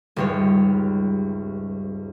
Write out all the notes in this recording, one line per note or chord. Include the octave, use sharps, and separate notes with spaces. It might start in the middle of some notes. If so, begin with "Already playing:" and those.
D#1 C#2 G2 G#3 C#5